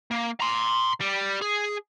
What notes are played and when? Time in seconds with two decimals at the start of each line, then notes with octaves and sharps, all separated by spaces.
0.11 A#3
0.40 A#5 C6
1.01 G3
1.41 G#4